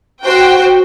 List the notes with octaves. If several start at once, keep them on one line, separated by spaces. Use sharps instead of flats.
F#4 C5 G5